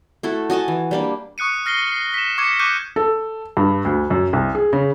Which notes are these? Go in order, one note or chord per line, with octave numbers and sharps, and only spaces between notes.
A3 E4 F#4 A4
F#4 D#5 G#5 A5
E3
G3 A#3 D4
C#6 D#6 F#6 C#7 D#7
F6 A#6 C7 G7
C7
B6 E7
C#6 D6 G#6 C#7 E7
C#6 D6 F#6 G6 C#7 D#7
A4
G2
D2
F#2
C2
G#4
C#3